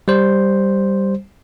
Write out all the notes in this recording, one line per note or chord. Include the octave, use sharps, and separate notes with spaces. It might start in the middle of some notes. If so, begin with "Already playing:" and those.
G3 C5